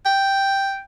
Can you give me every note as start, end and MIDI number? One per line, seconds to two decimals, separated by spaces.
0.06 0.81 79